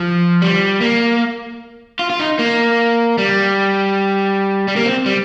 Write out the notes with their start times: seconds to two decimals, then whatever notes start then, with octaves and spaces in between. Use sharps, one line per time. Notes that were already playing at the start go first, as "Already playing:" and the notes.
Already playing: F3
0.42 G3
0.81 A#3
1.99 F4
2.10 F4
2.20 D#4
2.39 A#3
3.18 G3
4.68 G3
4.76 A#3
4.86 C4
5.06 G3